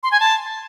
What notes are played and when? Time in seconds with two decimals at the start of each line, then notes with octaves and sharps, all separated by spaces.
0.03 C6
0.12 G#5
0.20 A5